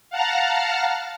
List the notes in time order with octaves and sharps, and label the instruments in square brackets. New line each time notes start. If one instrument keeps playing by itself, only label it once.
[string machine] F5 F#5 A5 A#5 F6